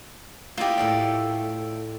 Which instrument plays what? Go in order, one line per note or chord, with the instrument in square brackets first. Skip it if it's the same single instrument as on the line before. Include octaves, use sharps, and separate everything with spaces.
[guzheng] A#3 E4 D#5 [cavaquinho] F4 G4
[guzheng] A2 A4 D5